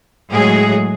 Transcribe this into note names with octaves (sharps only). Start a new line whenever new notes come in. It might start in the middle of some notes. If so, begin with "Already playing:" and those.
A2 F#3 G#3 G#4